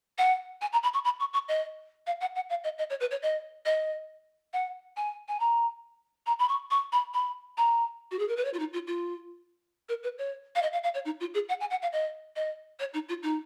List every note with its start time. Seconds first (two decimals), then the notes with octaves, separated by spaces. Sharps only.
0.18 F#5
0.61 G#5
0.73 A#5
0.83 B5
0.94 C#6
1.05 B5
1.20 C#6
1.33 C#6
1.48 D#5
2.07 F5
2.21 F#5
2.35 F#5
2.49 F5
2.64 D#5
2.78 D#5
2.90 C#5
3.00 B4
3.11 C#5
3.22 D#5
3.65 D#5
4.53 F#5
4.97 G#5
5.28 G#5
5.40 A#5
6.26 A#5
6.39 B5
6.49 C#6
6.71 C#6
6.92 B5
7.14 B5
7.57 A#5
8.11 F#4
8.19 G#4
8.28 A#4
8.36 B4
8.45 C#5
8.53 F4
8.59 D#4
8.73 F4
8.87 F4
9.89 A#4
10.03 B4
10.18 C#5
10.55 F5
10.62 D#5
10.73 F5
10.84 F5
10.94 C#5
11.05 D#4
11.20 F4
11.34 G#4
11.49 F#5
11.60 G#5
11.70 F#5
11.82 F5
11.93 D#5
12.36 D#5
12.79 C#5
12.94 D#4
13.09 F4
13.23 D#4